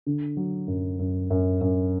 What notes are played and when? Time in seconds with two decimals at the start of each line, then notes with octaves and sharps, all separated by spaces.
0.06 D3
0.37 F#3
0.68 F#2
0.99 F#2
1.30 F#2
1.61 F#2